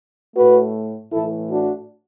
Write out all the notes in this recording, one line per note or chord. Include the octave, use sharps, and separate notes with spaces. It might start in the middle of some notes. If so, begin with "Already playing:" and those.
A2 A3 F#4 B4
A2 E3 A3 E4 A4
D4 F#4